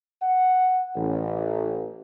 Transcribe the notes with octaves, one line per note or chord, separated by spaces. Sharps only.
F#5
A1